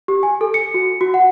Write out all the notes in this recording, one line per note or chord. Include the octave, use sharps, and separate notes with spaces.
G4
G#5
A4
C#7
F#4
F#4
F#5